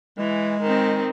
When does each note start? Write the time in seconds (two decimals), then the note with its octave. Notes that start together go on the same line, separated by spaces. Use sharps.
0.18 E3 G#3
0.61 D#3 C4